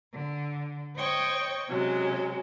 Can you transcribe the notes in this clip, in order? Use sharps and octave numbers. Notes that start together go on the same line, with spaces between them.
D3
C5 C#5 D#5 G5 C#6
C3 F#3 G#3 C#4